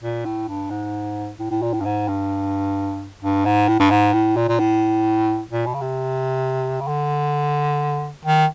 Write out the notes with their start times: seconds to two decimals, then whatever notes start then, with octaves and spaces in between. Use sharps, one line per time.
0.02 A#2
0.25 A2
0.48 G2
0.70 G#2
1.39 A2
1.51 A2
1.62 A#2
1.73 A2
1.80 G2
1.85 G#2
2.08 G2
3.22 G2
3.45 G#2
3.68 A2
3.80 G2
3.91 G#2
4.13 A2
4.36 A#2
4.48 A#2
4.60 A2
5.51 A#2
5.66 B2
5.74 C#3
5.81 C3
6.80 C#3
6.88 D3
8.25 D#3